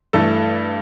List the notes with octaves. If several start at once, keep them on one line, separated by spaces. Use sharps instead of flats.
G2 E3 A3 A4